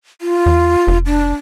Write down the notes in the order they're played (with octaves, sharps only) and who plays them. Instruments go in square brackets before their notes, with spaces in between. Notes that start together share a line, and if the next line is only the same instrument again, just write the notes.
[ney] F4
[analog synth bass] E2
F1
[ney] D4